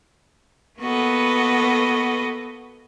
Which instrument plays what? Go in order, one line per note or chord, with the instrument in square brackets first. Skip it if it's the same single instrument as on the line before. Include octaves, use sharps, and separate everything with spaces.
[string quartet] A#3 B3 F#4 A4 B4 D#5